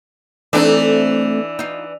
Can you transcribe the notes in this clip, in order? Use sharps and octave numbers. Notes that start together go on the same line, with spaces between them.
E3 A3 C4 D4 D#4
D#4 F4